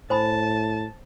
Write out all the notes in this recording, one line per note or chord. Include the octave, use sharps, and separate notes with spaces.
A2 C5 G#5 A5 B5